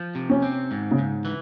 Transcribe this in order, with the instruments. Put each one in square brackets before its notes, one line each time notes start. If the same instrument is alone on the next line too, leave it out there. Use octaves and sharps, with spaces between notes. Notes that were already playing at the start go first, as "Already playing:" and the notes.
Already playing: [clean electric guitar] F3
C3
[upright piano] C#4
[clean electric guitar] C4
G#2
[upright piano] C#3
[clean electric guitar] G#2
E3